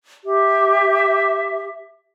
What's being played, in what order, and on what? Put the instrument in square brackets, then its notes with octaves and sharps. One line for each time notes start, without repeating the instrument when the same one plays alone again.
[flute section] G4 E5